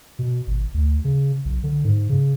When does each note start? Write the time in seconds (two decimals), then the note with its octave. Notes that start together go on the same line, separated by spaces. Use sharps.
0.19 B2
0.47 G#1
0.74 D2
1.05 C#3
1.45 B1
1.63 D3
1.85 G#2
2.09 C#3